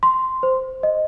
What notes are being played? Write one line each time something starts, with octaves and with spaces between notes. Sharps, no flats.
C6
C5
D#5